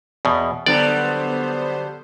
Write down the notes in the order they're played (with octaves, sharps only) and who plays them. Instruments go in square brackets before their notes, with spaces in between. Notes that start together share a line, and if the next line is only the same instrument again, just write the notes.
[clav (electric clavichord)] E2 B2
[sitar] D3 F#3 G3 [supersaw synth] B3 C5 [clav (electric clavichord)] D5